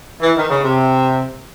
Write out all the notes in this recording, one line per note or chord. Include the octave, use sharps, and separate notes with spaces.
E3
D#3
C#3
C3